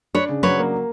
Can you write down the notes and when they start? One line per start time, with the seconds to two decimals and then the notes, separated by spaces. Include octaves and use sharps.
0.14 D4 B4 C#5
0.29 C#3
0.43 F#3 B4 C#5
0.58 A#3